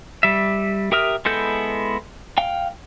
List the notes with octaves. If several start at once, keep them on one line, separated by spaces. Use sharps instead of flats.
G3 E5
G4 A#4 E5 D#6 F6
G#3 B3 E4 A4 G6
F5 G5